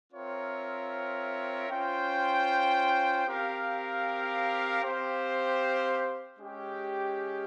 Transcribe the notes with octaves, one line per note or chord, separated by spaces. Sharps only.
C4 F4 A#4 C#5 E5
C#4 F4 C5 G5
C4 G4 A#4 F5
C4 G4 C5 F5
G#3 C#4 G4